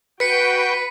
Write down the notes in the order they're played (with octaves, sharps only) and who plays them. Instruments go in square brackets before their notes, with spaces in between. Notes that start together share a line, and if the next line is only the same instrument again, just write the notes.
[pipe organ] F#4 G5 [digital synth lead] B4 [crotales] B6 C#7